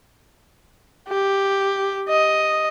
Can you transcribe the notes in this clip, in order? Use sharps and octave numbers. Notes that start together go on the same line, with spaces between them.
G4
D#5